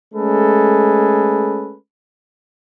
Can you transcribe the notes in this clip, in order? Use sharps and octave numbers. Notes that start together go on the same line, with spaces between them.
G#3 A3 C#4 G#4 A4 B4